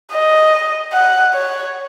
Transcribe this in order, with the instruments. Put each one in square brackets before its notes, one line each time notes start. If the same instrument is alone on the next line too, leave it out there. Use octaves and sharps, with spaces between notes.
[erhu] D#5
F#5
C#5